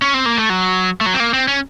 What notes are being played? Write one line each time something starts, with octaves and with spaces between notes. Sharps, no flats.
C#4
C4
A#3
A3
F#3
A3
F#3
C4
A#3
C4
C#4